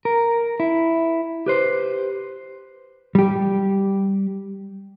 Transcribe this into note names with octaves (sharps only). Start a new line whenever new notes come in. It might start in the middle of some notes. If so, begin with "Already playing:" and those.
A#4
E4
G4 B4 C5
G3 G4